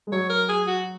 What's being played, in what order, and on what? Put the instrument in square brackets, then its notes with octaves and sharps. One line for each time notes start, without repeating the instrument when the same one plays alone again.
[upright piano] G#3
[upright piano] F#3 [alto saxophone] C#5
[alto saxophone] A#4
G#4
F#4